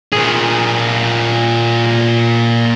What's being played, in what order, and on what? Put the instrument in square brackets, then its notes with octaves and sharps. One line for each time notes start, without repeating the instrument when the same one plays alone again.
[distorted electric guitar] A#2 G#4